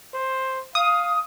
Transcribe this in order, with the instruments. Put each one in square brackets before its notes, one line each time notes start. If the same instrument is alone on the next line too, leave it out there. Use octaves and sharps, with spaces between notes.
[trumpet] C5
[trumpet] F5 [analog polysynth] D#6